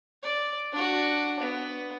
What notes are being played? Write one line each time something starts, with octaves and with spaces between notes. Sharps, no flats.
D5
D4 F#4
B3